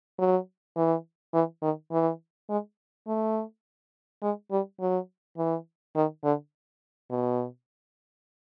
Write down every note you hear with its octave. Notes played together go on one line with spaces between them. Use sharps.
F#3
E3
E3
D#3
E3
G#3
A3
G#3
G3
F#3
E3
D#3
D3
B2